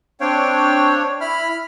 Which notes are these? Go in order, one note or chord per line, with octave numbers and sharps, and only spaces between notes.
C4 D4 C#5 F5 G5
E4 B5 F6